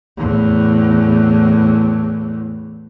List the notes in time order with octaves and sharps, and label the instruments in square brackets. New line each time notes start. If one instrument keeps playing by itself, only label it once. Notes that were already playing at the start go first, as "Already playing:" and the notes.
[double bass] E2 A2